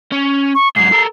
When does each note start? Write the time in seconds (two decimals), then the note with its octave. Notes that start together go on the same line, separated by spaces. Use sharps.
0.12 C#4
0.55 C#6
0.76 G#2 F#3 C7
0.92 A4 A#4